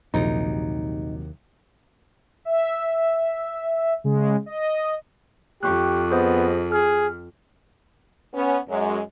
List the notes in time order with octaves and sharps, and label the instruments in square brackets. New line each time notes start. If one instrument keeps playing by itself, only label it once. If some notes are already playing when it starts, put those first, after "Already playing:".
[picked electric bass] A#1 [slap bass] D#2 [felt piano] C3 F#3 [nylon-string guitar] D#4
[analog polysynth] E5
C#3 G#3
D#5
[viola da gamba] F2 [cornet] G4 [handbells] C#6 D6 F#6
[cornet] B3 [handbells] G#4 C5 D#5
[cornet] G#4 [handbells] F6
[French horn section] B3 C#4
F#2 G#3